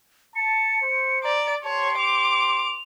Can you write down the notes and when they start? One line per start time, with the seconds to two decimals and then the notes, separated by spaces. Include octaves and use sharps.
0.36 A5 C#7
0.82 C5
1.23 D5 A#5
1.64 G4 C5 C#5 A5 C6
1.98 D6 F7